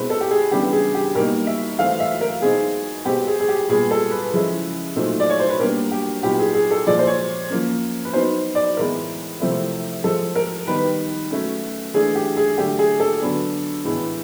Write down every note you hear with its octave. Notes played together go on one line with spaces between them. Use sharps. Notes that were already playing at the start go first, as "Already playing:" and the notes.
Already playing: B2 G#3 C4 E4 B4
A4
G4
G#4
C#3 E3 G3 B3 D4 G4
G#4
G4
B2 G3 A#3 D#4 A#4
E5
E3 A3 C4 F5
E5
A#4
B2 G#3 C4 D#4 G#4
B2 G#3 C4 G4
G#4
G#4
G4
A#2 G3 B3 G#4
A4
B4
C#3 F3 G#3 C#4 E4
A#2 F#3 A3 C4 D#4
D5
C#5
C5
B4
B2 G3 A#3 D4 A#4
G4
A#2 F#3 B3 D#4 G4
G#4
G#4
A4
A#2 F3 G#3 D5
C5
C#5
F3 A#3 C#4
B4
F#3 B3 D#4 C5
D5
A2 E3 G#3 B3 A#4
C3 F3 A3 C4 E4
F3 G#3 C4 A4
A#4
D#3 G3 B3 D#4 B4
F#3 A3 C#4
E3 A3 D4 G#4
G4
G#4
D3 F#3 A3 D4 G4
G#4
A4
D3 F#3 B3 D4
A2 E3 G#3 B3